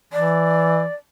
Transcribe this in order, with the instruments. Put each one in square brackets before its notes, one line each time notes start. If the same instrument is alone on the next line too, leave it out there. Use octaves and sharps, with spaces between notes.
[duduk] E3 [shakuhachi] D5